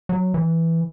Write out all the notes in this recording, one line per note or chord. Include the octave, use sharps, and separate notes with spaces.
F#3
E3